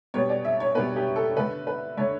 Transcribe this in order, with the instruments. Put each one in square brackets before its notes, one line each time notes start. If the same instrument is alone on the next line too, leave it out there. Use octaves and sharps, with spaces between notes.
[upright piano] B2 G3 B3 C#5
D5
E5
C#5
B2 G3 B3 B4
G4
A4
D3 A3 B4
B4
D3 A3 C#5